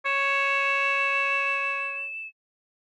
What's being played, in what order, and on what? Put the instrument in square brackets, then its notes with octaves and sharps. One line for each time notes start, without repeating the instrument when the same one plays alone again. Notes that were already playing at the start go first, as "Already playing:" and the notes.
[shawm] C#5 [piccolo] E7